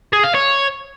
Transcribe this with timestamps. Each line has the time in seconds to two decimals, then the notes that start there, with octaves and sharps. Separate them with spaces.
0.13 G#4
0.24 F5
0.35 C#5